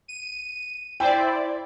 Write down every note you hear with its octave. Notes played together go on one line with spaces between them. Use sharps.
D#7
E4 C5 D5 G5